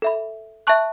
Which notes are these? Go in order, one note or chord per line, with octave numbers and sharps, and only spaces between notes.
A4 E5 B5
E5 A5 C#6 F#6